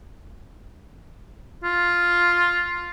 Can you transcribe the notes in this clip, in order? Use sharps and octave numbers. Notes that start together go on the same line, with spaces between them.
F4